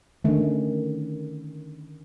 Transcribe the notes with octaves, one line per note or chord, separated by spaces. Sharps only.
D3 D#3 A3 C#4